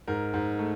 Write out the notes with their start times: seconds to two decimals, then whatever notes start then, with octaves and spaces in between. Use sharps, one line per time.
0.07 G#2 A#4
0.34 G#2
0.59 A3